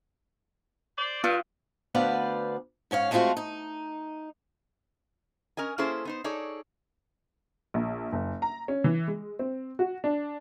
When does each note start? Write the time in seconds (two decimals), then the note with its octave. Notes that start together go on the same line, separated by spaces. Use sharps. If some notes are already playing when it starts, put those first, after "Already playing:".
0.98 C5 D5
1.24 G2 F4
1.95 D2 B3 B4 C5 D5 F5
2.91 G#2 C#4 C#5 F5
3.11 G#3 A3 C4 D#4 F4 F#4
3.37 D#4
5.57 C#4 A#4 D#5 G#5
5.78 A#3 C#4 E4 G#4 A4 C5
6.05 B3 D#4 C5
6.24 D#4 G#4 A4 C#5 D5
7.74 A#1
8.13 F#1
8.42 A#5
8.68 C#4
8.84 E3
9.08 G#3
9.39 C4
9.79 F#4
10.04 D4